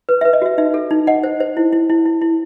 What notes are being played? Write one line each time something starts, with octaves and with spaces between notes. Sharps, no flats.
B4
E5
B4
D#5
F#4 E5
D#4 E5
A4
D#4
D#4 D#5 F#5
C5
C5
E4
E4
E4
E4
E4